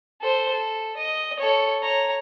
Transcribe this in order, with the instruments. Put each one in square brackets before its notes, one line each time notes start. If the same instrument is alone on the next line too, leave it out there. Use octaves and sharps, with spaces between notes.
[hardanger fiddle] A4 C5
A4
D#5
A4 C#5
C#5 A#5